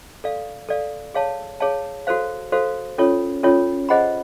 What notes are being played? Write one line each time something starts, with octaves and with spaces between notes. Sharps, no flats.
A4 D5 F5
A4 D5 F5
G#4 C#5 F5 A5
G#4 C#5 F5 A5
F#4 A4 C5 F5
F#4 A4 C5 F5
C#4 F4 A4 C#5
C#4 F4 A4 C#5
G#4 C5 D#5 F#5 B5